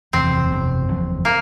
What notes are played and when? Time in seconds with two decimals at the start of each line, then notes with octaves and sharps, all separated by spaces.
0.13 F#1 E2 C3 F3 C4
0.50 F#1 E2 C3 F3
0.88 F#1 E2 C3 F3
1.25 A#3